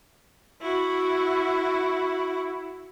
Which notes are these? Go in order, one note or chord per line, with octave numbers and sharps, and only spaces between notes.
E4 F#4